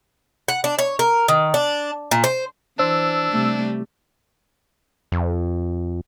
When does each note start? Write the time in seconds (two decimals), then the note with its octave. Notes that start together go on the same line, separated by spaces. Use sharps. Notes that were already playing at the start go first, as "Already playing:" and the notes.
0.48 F#5
0.64 D4
0.79 C#5
0.99 A#4
1.28 D#3
1.54 D4
2.11 A#2
2.24 C5
2.79 E3 D4 C5 E6
3.31 C3 G3 A3
5.12 F2